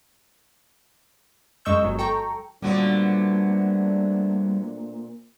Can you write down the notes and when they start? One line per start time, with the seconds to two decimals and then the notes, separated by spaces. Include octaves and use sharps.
1.65 F#2 G#3 D#5 C#6 E6 G6
1.83 G1 F#3
1.99 A4 G5 A#5 C#6
2.62 A#2 D3 F#3 G3 A3 B3 C4 D4